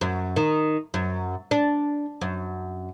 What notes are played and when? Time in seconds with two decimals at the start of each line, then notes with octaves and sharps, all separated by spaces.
0.01 F#2
0.36 D#3
0.94 F#2
1.51 D4
2.21 F#2